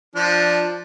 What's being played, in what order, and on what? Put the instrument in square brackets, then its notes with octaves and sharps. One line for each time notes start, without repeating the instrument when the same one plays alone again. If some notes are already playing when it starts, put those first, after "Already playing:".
[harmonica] F3 D4